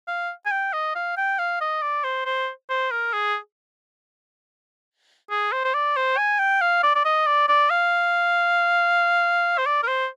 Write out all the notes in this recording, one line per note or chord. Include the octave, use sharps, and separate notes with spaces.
F5
G#5
G5
D#5
F5
G5
F5
D#5
D5
C5
C5
C5
A#4
G#4
G#4
C5
C5
D5
C5
G#5
G5
F5
D5
D5
D#5
D5
D5
F5
C5
D5
A#4
C5